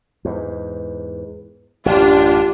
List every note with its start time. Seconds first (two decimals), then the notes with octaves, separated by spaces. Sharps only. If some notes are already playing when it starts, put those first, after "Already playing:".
0.25 E2 G#2
1.86 A1 F#2 D4 F4 G4